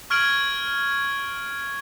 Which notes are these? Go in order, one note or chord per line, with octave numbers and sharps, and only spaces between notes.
C#6 F6 G#6 D7 F#7